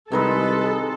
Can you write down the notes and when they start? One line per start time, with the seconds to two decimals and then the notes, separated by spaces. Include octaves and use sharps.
0.12 C2 C3 D#3 G#3 A4 B4